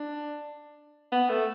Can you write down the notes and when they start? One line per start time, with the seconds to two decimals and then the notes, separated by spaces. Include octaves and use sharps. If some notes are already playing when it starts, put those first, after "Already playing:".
Already playing: D4
1.12 B3
1.29 A3